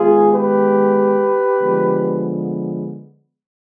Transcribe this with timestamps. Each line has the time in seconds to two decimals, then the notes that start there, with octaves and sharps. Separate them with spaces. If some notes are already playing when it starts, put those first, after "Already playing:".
Already playing: D#3 G#3 B3 F4 G#4
0.32 G4 B4
1.60 D3 F3 G#3 B3